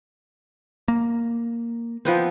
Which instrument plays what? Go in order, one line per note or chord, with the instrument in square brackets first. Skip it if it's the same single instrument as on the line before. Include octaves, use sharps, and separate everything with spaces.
[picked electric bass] A#3
[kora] F3 B3 C4